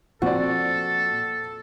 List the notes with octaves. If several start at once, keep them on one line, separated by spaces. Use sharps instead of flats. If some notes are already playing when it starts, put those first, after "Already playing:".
A#2 F3 C4 F#4 A4 D5